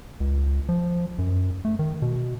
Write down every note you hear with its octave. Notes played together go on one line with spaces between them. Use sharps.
C#2
F3
F#2
A3
D#3
B2